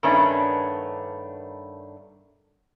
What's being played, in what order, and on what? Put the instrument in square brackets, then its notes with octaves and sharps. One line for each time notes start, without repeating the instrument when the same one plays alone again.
[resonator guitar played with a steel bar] G2 D#3 A3 B3 C#4 D4